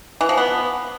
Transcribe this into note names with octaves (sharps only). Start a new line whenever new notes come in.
E3
F3
B3